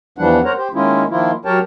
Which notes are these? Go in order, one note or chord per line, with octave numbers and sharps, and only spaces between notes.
E2 E3 F3 G3 D4 F#5
A#4 C5 C#5 F#5 A#5
G4 C5
D#3 G#3 A#3 C#4 E4 F4
D#3 F3 A#3 E4 F4
F#3 G4 A#4 C#5 G5 A5